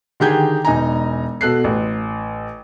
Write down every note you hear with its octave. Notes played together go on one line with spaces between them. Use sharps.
D3 D#3 G4 G#4 G6 G#6
E1 D#4 G#5 A#5
B2 A4 F#6 C7
A1